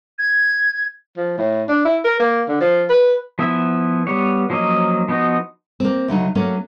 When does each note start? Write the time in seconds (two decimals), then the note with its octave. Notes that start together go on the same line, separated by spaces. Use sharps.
0.19 G#6
1.17 F3
1.38 A2
1.69 D4
1.85 E4
2.05 A#4
2.20 A#3
2.49 D3
2.61 F3
2.89 B4
3.39 F3 B3 E4 E5
4.07 G3 B3 C#5
4.50 F3 F#3 A#3 C#4 D#5
5.08 F3 B3 D#4 F#4
5.80 A#3 C4
6.08 D2 C#3 F#3 D#4
6.35 F#3 A3 A#3 C#4